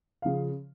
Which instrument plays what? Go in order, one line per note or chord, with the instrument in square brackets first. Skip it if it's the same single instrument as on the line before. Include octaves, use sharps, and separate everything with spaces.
[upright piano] C#3 F3 F5